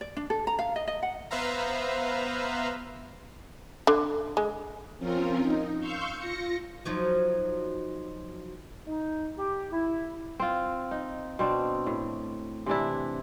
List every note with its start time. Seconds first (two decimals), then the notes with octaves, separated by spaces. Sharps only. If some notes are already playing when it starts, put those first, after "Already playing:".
0.01 D5
0.17 D4
0.30 A4
0.47 A#5
0.59 F5
0.76 D#5
0.88 D#5
1.03 F#5
1.31 B3 B4 C5 E5 F5 A#5
3.87 D3
4.37 G#3
4.98 F3 C4 C#4 F4 A#4
5.40 D#4
5.79 F5 C6 C#6 E6 F6 G6
6.18 F4 A#6 C#7
6.85 F3 F#3 D#4
8.87 D#4
9.38 G4
9.72 E4
10.40 C4 F4
10.91 D#4
11.39 B2 C4 D4
11.86 A2
12.66 C3 E3 D4 E4